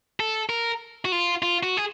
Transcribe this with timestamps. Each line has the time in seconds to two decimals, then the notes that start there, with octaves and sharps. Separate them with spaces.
0.20 A4
0.49 A#4
1.05 F#4
1.12 F4
1.42 F4
1.63 F#4
1.77 G#4